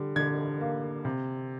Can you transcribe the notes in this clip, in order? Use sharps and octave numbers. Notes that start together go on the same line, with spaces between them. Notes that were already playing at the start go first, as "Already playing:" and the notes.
Already playing: D3 G3
D3 G#6
A#3
C3